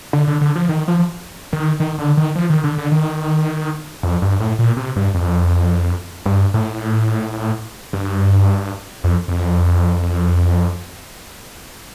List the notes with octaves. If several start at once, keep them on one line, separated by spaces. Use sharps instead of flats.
D3
D3
D3
F3
D#3
F3
D#3
D#3
D3
D#3
F3
D#3
D3
D3
D#3
F2
G2
A2
A#2
C3
G2
F2
G2
A2
G2
F2
F2